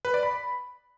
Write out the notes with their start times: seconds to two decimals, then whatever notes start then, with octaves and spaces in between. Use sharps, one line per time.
0.05 B4
0.14 D5
0.23 B5